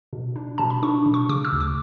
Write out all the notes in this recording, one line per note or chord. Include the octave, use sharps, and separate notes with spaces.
B2
D4
B2 A5
B5
D4 C#6
B2
C#6
C#3 D6
E6
D2
D6